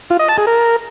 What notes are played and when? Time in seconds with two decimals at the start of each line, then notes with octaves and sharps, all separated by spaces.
0.10 F4
0.19 D#5
0.29 A5
0.38 G#4
0.47 A#4